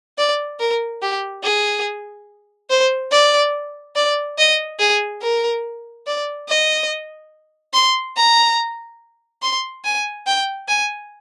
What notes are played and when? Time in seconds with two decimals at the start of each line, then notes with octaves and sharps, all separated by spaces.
0.18 D5
0.60 A#4
1.02 G4
1.44 G#4
2.70 C5
3.12 D5
3.96 D5
4.38 D#5
4.80 G#4
5.22 A#4
6.07 D5
6.49 D#5
7.74 C6
8.17 A#5
9.42 C6
9.85 G#5
10.27 G5
10.68 G#5